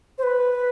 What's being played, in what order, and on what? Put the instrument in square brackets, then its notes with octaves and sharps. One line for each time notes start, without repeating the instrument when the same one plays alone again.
[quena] C5
B4